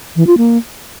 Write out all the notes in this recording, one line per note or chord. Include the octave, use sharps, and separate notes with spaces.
E3
F4
A#3